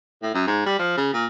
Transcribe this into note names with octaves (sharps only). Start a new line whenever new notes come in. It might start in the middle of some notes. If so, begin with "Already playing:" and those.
A2
F#2
G#2
G3
F3
C#3
A#2